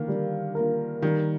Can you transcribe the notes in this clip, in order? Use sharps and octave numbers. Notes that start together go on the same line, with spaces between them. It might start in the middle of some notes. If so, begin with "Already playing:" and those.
Already playing: D3 D#3 A#3 F4
G3
A#3 F4 A#4
D#3 G3